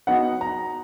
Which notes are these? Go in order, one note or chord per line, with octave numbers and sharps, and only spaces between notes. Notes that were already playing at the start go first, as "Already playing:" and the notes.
F#3 B3 D#4 F#5
A#5